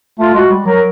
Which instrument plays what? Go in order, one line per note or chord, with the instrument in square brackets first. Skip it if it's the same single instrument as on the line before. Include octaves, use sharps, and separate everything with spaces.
[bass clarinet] A3 [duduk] F4
[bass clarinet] G#3 [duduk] F#4
[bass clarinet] G3
[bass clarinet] F#3 [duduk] A#4